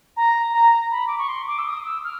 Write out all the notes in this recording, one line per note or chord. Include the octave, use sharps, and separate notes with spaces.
A#5
A#5
B5
D6
C#6
C6
D6
E6
D#6
E6
F6